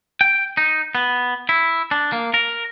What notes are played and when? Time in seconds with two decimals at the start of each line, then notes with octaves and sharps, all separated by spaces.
0.21 G5
0.57 D#4
0.95 B3
1.49 E4
1.91 D4
2.12 A#3
2.34 A#4